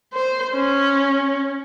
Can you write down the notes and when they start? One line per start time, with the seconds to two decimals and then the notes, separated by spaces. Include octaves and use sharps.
0.14 C5
0.54 C#4